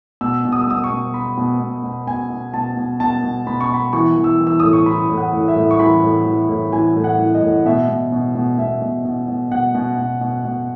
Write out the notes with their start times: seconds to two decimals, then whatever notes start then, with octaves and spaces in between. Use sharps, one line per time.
0.21 B2 E6
0.45 B2
0.52 D#6
0.61 E6
0.67 B2 D#6
0.84 C#6
0.90 B2
1.14 B2 B5
1.38 B2
1.61 B2
1.84 B2
2.07 B2 G#5
2.30 B2
2.54 B2 A5
2.77 B2
3.00 B2 A5
3.24 B2
3.47 B2 B5
3.61 C#6
3.70 B2 B5
3.93 E3 C#6
4.17 E3
4.24 E6
4.40 E3
4.47 E6
4.60 A2 D#6
4.73 C#6
4.86 E3 B5
5.10 A2
5.17 F#5
5.33 A2
5.48 E5
5.56 A2
5.71 C#6
5.79 E3 B5
6.03 A2
6.26 E3
6.49 A2
6.72 E3 G#5
6.96 A2
7.04 F#5
7.19 E3
7.34 D#5
7.42 A2
7.66 B2 E5
7.89 B2
8.12 B2
8.35 B2
8.59 B2 E5
8.82 B2
9.05 B2
9.28 B2
9.51 B2 F#5
9.75 B2
9.98 B2
10.21 B2
10.45 B2